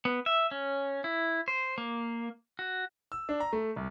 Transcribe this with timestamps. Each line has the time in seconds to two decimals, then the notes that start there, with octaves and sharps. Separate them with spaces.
0.05 B3
0.26 E5
0.51 C#4
1.04 E4
1.48 C5
1.78 A#3
2.59 F#4
3.12 E6
3.29 D4
3.40 A#5
3.53 A3
3.76 C2